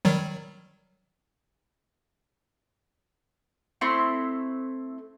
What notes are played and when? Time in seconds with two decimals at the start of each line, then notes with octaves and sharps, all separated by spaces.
0.05 D#3 F#3 G3
3.81 A3 C4 E4 C6